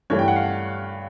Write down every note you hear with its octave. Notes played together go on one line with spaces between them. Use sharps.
G2 E3 A3 C#5
G5
F#5
F5